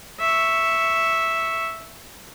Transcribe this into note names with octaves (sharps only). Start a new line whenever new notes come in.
E5 C#6